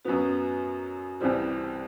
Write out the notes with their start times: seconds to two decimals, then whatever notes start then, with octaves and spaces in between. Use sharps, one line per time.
0.05 F#2 F#3 B3 F#4
1.20 C2 C3 E3 G3 C4 G4
1.50 G4